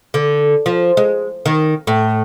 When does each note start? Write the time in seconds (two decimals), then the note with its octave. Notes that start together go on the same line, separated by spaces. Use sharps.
0.14 D3
0.66 F3
0.97 G#3
1.46 D#3
1.87 A2